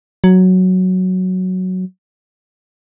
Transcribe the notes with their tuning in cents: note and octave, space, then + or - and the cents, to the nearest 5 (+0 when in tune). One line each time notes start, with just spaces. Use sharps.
F#3 +0